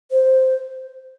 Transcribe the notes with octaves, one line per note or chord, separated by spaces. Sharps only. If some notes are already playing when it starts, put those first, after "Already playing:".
C5